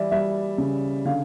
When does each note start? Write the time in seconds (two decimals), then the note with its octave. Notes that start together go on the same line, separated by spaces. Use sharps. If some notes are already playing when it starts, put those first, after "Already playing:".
Already playing: E3 G3 D5 E5
0.11 G3 E5
0.58 C#3
1.05 D3 F5